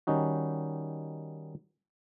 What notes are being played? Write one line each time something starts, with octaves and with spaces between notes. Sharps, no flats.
D#3 G3 C#4 D#4 F#4